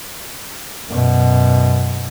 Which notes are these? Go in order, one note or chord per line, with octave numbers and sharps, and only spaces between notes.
F#2 B2